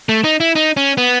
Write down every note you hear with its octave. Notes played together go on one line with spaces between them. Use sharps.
A3
D#4
E4
D#4
C#4
B3